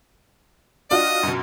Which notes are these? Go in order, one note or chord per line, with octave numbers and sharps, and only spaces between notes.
D4 F4 F#4 D#5
F#2 B2